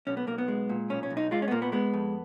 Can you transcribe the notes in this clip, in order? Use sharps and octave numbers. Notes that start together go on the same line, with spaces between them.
B1 C#4
B3
B1 A#3
B3
G#3
A#2
B1 C#4
C#4
B1
D#4
G#3 F4
C#4
B3
A#2 A#3
B3
G#3 B3
F2